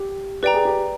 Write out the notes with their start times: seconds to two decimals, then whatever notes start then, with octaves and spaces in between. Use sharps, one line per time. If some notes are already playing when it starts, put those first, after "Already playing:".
Already playing: G4
0.43 G4 B4 D5 G5 A#5
0.54 G#4
0.65 G4